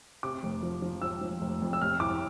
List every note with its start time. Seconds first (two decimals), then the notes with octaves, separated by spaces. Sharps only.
0.23 C3 D6
0.43 F1
0.63 F3
0.82 F3
1.02 F3 E6
1.21 F3
1.41 F1
1.62 F2
1.73 E6
1.81 C3 F6
2.00 C2 D6